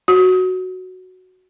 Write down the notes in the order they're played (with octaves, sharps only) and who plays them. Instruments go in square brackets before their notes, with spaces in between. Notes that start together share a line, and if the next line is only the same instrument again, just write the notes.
[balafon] F#4